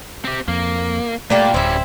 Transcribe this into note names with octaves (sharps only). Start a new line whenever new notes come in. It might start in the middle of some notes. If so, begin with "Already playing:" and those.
C4 G4
F2 A#3
A#2 G3 A3 A#3 D4
D1 G3 C4 C#4 E4